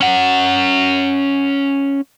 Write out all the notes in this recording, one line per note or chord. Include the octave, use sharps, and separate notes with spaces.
C#4 F#5